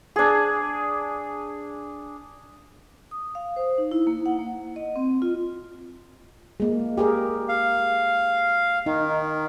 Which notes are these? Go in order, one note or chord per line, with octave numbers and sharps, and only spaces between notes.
D4 G#4
D#6
F5
C5
D#4
E4
A#3
F#5
A#3
D#5
C4
F4
G#3 A#3
G4 G#4 A#4
F5
D#3 D#4